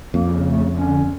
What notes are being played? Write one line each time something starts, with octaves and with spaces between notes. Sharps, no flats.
F2 A#3
C#3
A3
D3 C#4